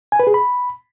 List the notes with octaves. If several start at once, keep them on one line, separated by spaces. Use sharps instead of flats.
G#5
B4
G#4
B5